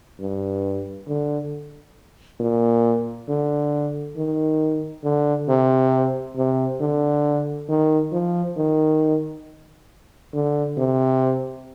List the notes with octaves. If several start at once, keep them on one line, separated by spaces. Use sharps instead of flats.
G2
D3
A#2
D3
D#3
D3
C3
C3
D3
D#3
F3
D#3
D3
C3